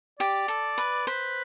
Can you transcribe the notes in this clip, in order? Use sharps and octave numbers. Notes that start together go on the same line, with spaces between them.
G4 D5
A4
B4
B4 C5